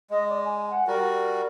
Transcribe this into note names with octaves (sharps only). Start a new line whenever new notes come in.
G#3 D#5
D5
G#5
F#5
G3 F#4 A#4